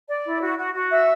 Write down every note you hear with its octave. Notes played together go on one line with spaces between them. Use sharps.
D5
E4
F#4
F#4
F#4
E5